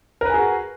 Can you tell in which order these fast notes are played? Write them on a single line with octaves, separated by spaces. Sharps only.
A#4 B4 G#5 G#4 F#4